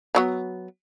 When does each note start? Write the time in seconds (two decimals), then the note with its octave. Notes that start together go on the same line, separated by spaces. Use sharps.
0.15 F3 F#3 B3